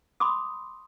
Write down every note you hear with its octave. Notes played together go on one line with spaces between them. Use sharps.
B5 C6 D6 D#6